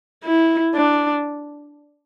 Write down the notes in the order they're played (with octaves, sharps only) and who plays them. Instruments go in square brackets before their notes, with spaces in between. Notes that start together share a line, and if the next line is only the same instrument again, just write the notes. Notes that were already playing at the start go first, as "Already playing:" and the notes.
[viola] E4
D4